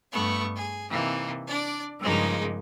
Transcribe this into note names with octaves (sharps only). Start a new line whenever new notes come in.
G2 A3 B3 C#6
G#4
C3 E3 A#3 D#4
D4 D5
G2 C#3 F3 G#3 A#3 D#4